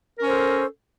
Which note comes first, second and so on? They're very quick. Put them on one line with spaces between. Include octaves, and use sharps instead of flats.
A#4 C#4 C5 A4